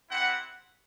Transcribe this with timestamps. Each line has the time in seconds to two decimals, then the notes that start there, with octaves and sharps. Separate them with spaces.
0.09 C4 E4 G4 F#5